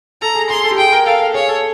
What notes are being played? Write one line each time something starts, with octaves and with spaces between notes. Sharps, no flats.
A4 A#5
G#4
G#4 C6
A4
G4
G#4 G5
A#4
A4 F5
G#4 C#5
A4